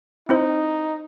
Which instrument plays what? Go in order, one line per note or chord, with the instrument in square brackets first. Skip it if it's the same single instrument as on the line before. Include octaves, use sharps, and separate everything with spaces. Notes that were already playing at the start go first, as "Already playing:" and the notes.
[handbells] C4 E4 C5 [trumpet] D#4